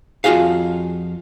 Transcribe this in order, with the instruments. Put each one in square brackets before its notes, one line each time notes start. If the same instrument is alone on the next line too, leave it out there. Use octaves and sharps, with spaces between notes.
[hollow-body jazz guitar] F2 F4 F#4 G#4 F5